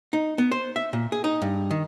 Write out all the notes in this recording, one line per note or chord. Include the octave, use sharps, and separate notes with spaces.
D#4
B3
C5
E5
A#2
G#4
D#4
G2
D#3